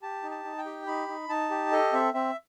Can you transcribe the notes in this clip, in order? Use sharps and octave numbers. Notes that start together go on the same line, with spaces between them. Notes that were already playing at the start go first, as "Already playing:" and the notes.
G4 A5
D#4
A5
D#4
G5
G4
D#4 B5
D#4
D#4 A5
G4
A4 D#5
C4 E5
C4 E5